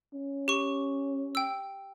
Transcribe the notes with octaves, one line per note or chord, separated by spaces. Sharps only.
C#4
G4 C#6
G5 E6